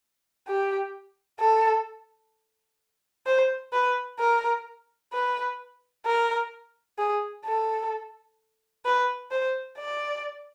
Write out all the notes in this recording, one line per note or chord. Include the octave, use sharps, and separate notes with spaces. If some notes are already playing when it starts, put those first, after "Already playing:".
G4
A4
C5
B4
A#4
B4
A#4
G#4
A4
B4
C5
D5